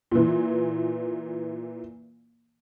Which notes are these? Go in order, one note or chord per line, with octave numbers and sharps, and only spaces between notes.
A#2 E3